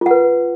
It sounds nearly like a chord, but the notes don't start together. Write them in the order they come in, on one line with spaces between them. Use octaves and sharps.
F4 F#5 B4